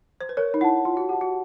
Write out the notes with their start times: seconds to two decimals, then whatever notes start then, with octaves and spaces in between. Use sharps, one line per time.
0.21 C5
0.29 B4
0.37 A#4 C#5
0.54 D#4
0.61 E4 F#5 A5
0.85 F4 C#5
0.97 F#4
1.09 G4 F#5 A5
1.21 F#4